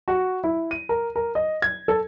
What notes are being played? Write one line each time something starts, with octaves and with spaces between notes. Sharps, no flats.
F#4
E4
D#7
A#4
A#4
D#5
G#6
A4